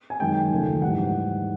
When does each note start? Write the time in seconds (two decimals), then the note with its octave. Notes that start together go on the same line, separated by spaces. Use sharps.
0.10 G#5
0.20 F#2 D#3 G#3 G5
0.51 D#2 C#3 F3 A3
0.82 G#2 E3 G3 F#5